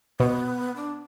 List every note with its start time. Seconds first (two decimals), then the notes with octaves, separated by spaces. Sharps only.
0.20 B2 B3
0.76 D4